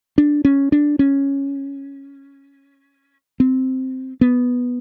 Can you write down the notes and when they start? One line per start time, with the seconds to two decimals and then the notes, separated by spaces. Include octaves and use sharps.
0.18 D4
0.45 C#4
0.72 D4
0.99 C#4
3.40 C4
4.21 B3